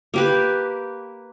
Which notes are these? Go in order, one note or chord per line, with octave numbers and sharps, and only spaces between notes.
A#3 G4 B4